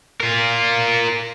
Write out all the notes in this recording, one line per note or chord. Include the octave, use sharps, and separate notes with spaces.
F4 A#4